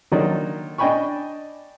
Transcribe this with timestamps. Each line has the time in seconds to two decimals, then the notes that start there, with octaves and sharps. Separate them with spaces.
0.12 D3 D#3 F#3 A#3 D#4 D5
0.78 D4 D#5 G5 G#5 B5 C#6